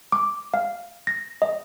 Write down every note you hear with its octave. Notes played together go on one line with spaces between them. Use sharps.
D6
F5
A#6
D#5